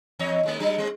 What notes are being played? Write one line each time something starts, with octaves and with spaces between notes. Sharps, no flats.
E2 C#5 D#5
D#2 G#3 A3
F#3 G#3 D4
G3 C4